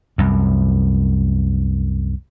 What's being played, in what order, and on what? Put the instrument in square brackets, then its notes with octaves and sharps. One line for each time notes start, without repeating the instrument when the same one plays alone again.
[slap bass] C2 F#2